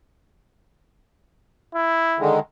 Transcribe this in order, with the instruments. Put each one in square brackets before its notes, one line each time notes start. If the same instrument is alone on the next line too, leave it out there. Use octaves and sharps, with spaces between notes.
[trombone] E4
[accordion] D3 D#3 G#3